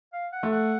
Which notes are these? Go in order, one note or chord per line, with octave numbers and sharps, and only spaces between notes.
F5
F#5
A3
F#5